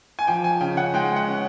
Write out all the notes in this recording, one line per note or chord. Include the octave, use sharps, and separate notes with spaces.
G#5
F3 G5
G#5
C#3 G5
F#5
G#3 G5
F#5
C#4